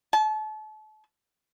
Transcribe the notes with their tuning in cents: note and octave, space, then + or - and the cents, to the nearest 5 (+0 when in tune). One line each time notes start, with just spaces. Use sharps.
A5 -35